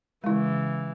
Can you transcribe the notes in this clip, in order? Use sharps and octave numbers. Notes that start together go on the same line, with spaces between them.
C#3 E3 G#3 E4